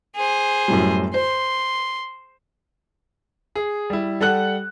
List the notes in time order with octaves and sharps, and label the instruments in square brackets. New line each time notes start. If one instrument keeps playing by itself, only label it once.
[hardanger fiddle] G#4 C5
[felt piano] F#2 A2 G3
[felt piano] C5 [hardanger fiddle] C6
[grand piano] G#4
G3 E4
G3 A4 F#5 F#6 F#7